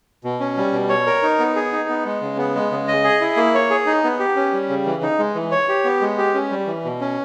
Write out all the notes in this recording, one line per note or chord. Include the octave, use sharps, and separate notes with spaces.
B2
C#4
G3
B2
C#5
A#4
D#4
B3
G#4
D#4
B3
G#3
C#3
B3
G#3
C#3
D#5
G#4
E4
A#3
C#5
G#4
D#4
B3
G4
C#4
G3
C#3
E3
D#4
G#3
E3
C#5
G4
B3
G#3
G4
C#4
G3
E3
B2
C#4